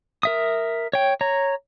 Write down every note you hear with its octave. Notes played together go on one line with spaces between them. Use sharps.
A#4 E5 D#6
C#5 G5
C#5 A#5